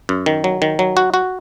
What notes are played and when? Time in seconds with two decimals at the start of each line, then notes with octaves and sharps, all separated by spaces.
0.09 F#2
0.26 D#3
0.44 F#3
0.62 D#3
0.79 F#3
0.97 F#4
1.14 F#4